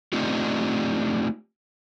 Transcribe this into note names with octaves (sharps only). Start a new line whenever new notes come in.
A3 C4 D4 D#4 F4 G4